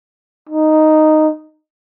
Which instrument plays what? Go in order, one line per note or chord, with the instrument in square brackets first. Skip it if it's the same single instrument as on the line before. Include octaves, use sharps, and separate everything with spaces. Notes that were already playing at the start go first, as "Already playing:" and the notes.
[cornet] D#4